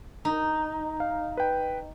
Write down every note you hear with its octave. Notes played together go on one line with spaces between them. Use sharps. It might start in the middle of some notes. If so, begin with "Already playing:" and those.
D#4
F5
B4 G5